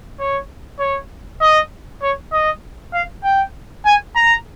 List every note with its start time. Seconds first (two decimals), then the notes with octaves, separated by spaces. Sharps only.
0.19 C#5
0.79 C#5
1.41 D#5
2.03 C#5
2.32 D#5
2.93 F5
3.24 G5
3.86 G#5
4.16 A#5